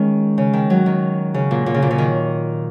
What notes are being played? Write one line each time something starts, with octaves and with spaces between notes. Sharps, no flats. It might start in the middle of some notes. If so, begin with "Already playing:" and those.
Already playing: D#3 G#3 C#4
C#3
D#3
F#3
D#3
C#3
A#2
A#2
C#3
A#2
C#3
D#3